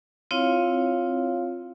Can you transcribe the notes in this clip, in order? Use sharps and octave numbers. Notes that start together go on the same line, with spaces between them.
C4 E4 F4 C#5 F5